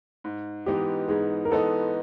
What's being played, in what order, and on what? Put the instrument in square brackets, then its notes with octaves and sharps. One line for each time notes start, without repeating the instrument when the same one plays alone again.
[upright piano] G#2
[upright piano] E3 G#3 B3 D#4 [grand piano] G4
[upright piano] G#2 [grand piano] G#4
[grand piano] A#4
[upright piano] E3 G#3 B3 D#4 [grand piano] A4